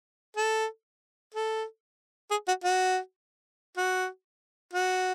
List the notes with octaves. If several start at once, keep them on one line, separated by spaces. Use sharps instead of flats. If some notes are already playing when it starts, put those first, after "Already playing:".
A4
A4
G#4
F#4
F#4
F#4
F#4